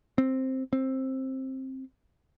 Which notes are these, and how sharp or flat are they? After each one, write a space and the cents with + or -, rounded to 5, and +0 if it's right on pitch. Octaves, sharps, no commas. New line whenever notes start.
C4 +5
C4 +15